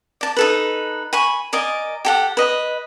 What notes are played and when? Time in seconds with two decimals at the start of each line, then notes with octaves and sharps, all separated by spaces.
0.21 D5 A5
0.37 D#4 A4 B4
1.13 G#5 B5 C#6
1.53 A#4 D5 D#5 G#5
2.05 G4 A4 F#5
2.37 B4 D#5